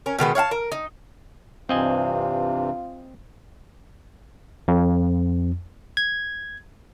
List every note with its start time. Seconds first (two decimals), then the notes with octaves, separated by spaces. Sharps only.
0.06 C#4 A#4
0.19 B2 D#3 G#3 B3
0.35 C#5 F5 F#5 A5
0.51 A#4
0.72 D#4
1.69 G2 C3 E3 C4 F4 D#5 G#5
4.68 F2
5.97 G#6